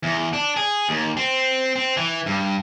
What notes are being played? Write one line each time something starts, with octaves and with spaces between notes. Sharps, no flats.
E2
D4
G#4
D#2
C4
C4
E3
G2